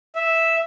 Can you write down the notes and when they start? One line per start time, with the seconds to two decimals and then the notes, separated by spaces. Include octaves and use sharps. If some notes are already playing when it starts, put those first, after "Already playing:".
0.15 E5